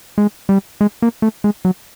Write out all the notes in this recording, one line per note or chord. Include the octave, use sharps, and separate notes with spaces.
G#3
G3
G#3
A#3
A3
G#3
F#3